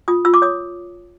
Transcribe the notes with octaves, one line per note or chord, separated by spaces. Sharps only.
F4 D#6
F4 E6
D6
C#5 D#6